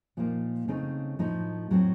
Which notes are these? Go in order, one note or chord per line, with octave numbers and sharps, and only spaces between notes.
A#2 F3 A#3 D#4
C#3 A3 C4 D#4
A2 F3 A3 D#4
A2 F#3 A3 C4